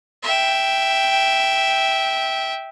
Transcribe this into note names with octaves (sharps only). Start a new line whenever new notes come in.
E5 G5